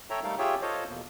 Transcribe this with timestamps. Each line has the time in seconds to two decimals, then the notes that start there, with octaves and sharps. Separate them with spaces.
0.10 A4 C#5 E5 G5 A#5
0.24 G3 A3 D#4 A4 A#4 F5
0.39 F4 G4 G#4 C#5 E5 G5
0.62 F4 A4 C5 C#5 D#5 F5
0.89 E2 B2 A#3